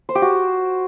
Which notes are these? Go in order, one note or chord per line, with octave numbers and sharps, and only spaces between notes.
C5
G4
F#4